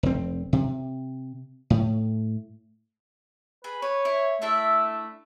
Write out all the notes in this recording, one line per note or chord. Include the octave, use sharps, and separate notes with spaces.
F1 C4
C3
A2
G#4 B4
B4 C#5
E4
A3 D4 E4 E5